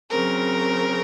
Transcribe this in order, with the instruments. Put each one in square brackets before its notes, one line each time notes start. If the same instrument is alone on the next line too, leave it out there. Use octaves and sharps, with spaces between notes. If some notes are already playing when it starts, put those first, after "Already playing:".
[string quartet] C#3 F#3 C4 [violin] A#4